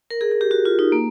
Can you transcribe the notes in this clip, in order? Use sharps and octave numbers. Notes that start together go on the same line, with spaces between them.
A#4
G#4
G#4
G4
F#4
F4
D#4
A#3